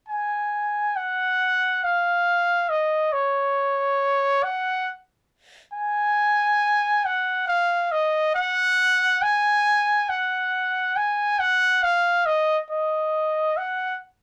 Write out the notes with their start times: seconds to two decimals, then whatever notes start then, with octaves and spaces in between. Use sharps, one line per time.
0.09 G#5
0.96 F#5
1.84 F5
2.70 D#5
3.13 C#5
4.43 F#5
5.74 G#5
7.05 F#5
7.48 F5
7.92 D#5
8.35 F#5
9.22 G#5
10.09 F#5
10.97 G#5
11.40 F#5
11.83 F5
12.26 D#5
12.71 D#5
13.57 F#5